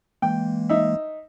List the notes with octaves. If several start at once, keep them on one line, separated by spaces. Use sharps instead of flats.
E3 G#3 A#3 G5
D#4 E5